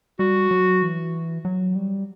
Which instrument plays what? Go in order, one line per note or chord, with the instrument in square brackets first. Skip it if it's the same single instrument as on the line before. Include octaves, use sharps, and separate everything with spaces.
[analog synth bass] G3 [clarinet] F#4
[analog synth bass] F#3
E3
F#3
G3